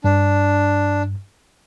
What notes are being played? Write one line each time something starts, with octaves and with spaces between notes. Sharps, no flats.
G2 D4